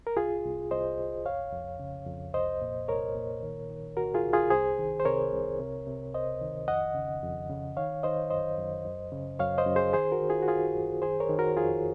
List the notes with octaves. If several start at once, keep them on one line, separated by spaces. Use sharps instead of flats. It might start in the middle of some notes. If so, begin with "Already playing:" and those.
A#4
C2 F4 G#4
C2
C2 C5 D#5
C2
F2 C#5 F5
F2
C#3
F2
C2 C5 D#5
A#2
C2 A#4 C#5
A#2
D#3
D#3
C2 F#4 A#4
F4 G#4
C2
F4 G#4
C2 G#4 C5
D#3
C5
C3 A#4 C#5
C2
C3
C3
C#2 C5 D#5
D#3
F2 D#5 F#5
C#3
F2
C#3
D#3 C#5 F5
D#3 C5 D#5
F#2 C5 D#5
F#2
F#2
C#3
F#2 C#5 F5
C5 D#5
F#2
G#4 C5
D#3 G#4 C5
F#4 A#4
D#3
F4 G#4
F#4
F#2 F4 G#4
F#2
D#3 G#4 C5
A#4 C#5
D#3
F#4 A#4
F2 F4 G#4